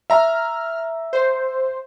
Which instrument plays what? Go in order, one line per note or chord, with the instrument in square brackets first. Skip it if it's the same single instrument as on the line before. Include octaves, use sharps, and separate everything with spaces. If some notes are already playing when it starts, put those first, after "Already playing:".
[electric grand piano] E5 A#5 [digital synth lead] F6
[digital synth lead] C5